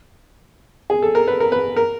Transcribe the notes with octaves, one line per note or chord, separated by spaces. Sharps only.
G#4
A4
A#4
B4
A#4
B4
A#4